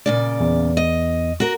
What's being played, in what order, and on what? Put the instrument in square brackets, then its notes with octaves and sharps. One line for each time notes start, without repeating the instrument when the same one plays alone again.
[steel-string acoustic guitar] A#2 C#3 D5
[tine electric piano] E2
[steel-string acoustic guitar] D#5
F#4 A#4